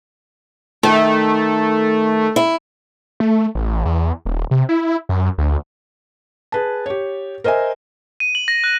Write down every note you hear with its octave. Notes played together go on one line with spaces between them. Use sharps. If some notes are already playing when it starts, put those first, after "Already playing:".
D#3 A3
E4
A3
A1
E2
D#1
C3
E4
F#2
D2
G#4 B4 A5
G4 C#5
A#4 C5 D#5 E5 G#5
D#7
F#7
A#6
F#6